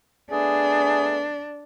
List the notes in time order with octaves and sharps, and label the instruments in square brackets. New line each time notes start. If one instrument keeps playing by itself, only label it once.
[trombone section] A3 B3 G#4 [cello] D4